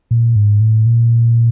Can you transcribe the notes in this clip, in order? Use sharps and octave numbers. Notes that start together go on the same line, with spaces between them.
A#2
G#2
A2
A#2